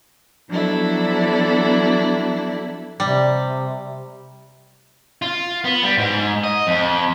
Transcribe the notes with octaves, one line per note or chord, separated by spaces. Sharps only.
F3 F#3 B3 D4 E4 A4
C3 G3
F4
B3
G3
G#2
D#5
F2